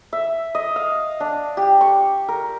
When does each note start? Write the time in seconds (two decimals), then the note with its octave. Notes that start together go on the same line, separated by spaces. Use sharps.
0.13 E5
0.55 D#5
0.76 F5
1.20 D4
1.57 G4
1.81 C#6
2.28 A#4